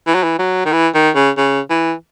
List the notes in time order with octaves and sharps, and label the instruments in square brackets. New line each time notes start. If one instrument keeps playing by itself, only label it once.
[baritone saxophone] E3
F#3
E3
F#3
D#3
E3
D#3
C#3
C#3
E3